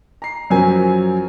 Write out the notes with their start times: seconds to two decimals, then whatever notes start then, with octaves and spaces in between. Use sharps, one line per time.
0.22 A#5 C7
0.50 F#2 F3 F#3 A#4 C5 G#5